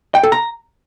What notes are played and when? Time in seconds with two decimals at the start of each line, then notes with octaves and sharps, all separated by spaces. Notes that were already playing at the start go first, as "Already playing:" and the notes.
0.15 G5
0.23 A4
0.32 A#5